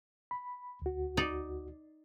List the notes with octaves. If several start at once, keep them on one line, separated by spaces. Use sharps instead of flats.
B5
D2 F#4
D#4 D5